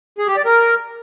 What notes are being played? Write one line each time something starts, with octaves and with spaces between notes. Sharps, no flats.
G#4
G4
D5
A#4